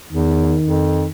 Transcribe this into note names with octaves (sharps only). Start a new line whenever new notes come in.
E2 D#3
F2